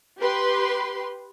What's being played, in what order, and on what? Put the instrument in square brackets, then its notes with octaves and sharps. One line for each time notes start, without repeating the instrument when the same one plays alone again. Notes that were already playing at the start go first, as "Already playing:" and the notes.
[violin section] G4 B4 C6